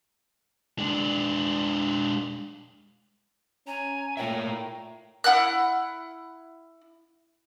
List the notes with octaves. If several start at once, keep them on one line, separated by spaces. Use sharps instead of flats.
G#3 D4
C#4 G#5 A#5
A#2 A3 C#5 E5 G5 A#5
E4 F#5 F6 F#6